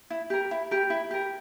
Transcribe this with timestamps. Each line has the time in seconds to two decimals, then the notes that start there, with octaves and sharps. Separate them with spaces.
0.10 E4
0.30 G4 A#4
0.51 E4
0.71 G4 A#4
0.90 E4
1.11 G4 A#4